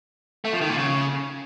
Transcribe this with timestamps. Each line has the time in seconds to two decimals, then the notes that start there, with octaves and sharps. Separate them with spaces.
0.45 A3
0.53 F3
0.61 D#3
0.69 A#2
0.78 C#3